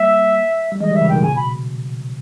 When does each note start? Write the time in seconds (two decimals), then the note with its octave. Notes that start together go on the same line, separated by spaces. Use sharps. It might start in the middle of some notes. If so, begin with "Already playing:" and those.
Already playing: G3 A#3 E5
0.72 G3
0.81 E3 G#3 D#5
0.91 D#3 G3
0.95 E5
1.01 C#3 E3
1.09 B2 D#3 G5
1.22 A#2 C#3 G#5
1.32 B2
1.36 B5